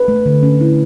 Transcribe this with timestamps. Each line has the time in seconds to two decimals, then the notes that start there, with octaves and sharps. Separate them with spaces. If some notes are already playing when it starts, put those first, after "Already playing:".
Already playing: B4
0.08 A3
0.26 D3
0.43 C#4
0.61 E4